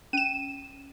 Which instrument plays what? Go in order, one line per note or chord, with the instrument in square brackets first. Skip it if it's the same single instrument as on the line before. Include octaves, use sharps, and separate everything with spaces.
[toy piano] C#4 [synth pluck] D#7 E7